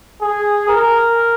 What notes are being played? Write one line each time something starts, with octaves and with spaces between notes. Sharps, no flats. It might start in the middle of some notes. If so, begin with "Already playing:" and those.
G#4
A#4